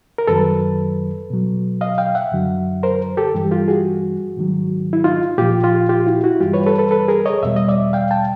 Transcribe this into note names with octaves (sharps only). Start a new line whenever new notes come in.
A#4
F#2 D#3 F#3 A4 B4
B2 F#3
D#5 F5
F5 G5
E5 F#5
F#2 D3 F#3
A#4 C5
G4 A4
G2 E3 G3
F4 G4
F#4 G#4
G#2 D#3 F#3
E4
D#4 F4
A#2 F3 F4 G4
F4 G4
F4 G4
E4 F#4
E4 F#4
G2 E3 G3 F4 G4
B4 C#5
A4 B4
A4 B4
A4 B4
G#4 A#4
C#5 D#5
E2 B2 G3 E5
D#5
D5 E5
F5 G5
G5 A5